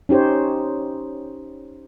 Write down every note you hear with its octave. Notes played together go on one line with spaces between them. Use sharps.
C#4 D#4 G4 C5 C#5